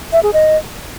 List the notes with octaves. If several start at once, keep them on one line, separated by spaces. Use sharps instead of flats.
E5
G#4
D#5